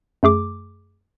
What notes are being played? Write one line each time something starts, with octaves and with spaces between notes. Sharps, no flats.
F#2 A3 G#4 D6